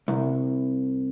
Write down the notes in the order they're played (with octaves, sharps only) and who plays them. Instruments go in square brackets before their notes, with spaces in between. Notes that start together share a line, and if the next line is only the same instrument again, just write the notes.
[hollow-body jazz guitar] C2